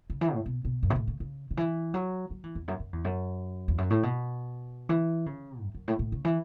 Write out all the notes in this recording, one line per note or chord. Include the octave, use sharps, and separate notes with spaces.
C#3
E3
A2
B2
B2
F#2
B2
A2
C#3
C#3
C#3
E3
F#3
F#3
E3
E2
F#2
F#2
E2
F#2
E2
F#2
A2
B2
E3
C#3
F#2
F#2
A2
A2
C#3
E3